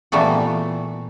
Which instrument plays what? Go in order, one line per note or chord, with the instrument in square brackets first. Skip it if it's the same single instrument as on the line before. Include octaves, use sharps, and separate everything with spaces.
[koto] A#2 E3 G3 A3 B3 F#4